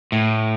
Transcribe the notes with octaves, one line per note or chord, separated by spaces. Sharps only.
A2